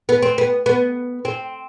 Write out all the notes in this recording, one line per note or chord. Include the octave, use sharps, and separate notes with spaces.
B3
C4
B3
B3
C4